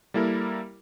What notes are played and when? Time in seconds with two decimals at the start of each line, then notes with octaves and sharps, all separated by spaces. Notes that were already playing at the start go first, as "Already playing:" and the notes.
0.14 G3 A#3 E4 A4 A#4